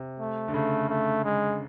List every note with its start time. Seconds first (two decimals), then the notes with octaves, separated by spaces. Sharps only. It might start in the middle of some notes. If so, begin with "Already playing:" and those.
Already playing: C3
0.19 A3
0.48 D3
0.54 C#3 A3
0.90 A3
1.25 G#3